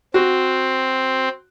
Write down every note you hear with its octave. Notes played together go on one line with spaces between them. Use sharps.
C4 F#4